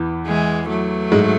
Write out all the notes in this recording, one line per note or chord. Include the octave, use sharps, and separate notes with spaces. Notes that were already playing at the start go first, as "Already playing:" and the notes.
Already playing: E2 E3
E3 G#3
F#3 A3
G#2 G#3